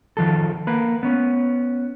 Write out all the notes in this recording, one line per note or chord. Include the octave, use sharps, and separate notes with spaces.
D#3 F3 A4
A#3 B4
B3 C#4